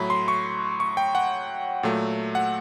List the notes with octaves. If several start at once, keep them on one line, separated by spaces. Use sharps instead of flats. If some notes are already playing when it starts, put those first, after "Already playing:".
Already playing: A2 F#3 A3 B5
C6
C#6
C#6
G5
F#5
A#2 F#3 A3
F#5